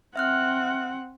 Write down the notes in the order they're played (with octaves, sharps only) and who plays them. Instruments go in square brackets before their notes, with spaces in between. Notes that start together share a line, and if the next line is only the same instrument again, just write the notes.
[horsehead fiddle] C4 F#5 [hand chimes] E5 F6 F#6